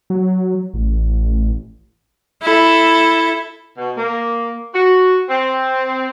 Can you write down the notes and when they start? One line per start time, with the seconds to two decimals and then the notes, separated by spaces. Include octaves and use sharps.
0.10 F#3
0.74 A1
2.42 E4 A4
3.78 B2
3.96 A#3
4.73 F#4
5.30 C4